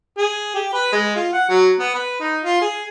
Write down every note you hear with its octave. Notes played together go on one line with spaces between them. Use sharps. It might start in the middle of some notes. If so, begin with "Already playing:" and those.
G#4
G4
B4
G#3
F4
F#5
F#3
B3
B4
D#4
F4
G#4